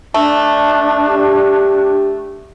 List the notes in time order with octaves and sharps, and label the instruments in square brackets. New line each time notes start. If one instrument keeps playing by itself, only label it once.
[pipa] A3 [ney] D4
[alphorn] G4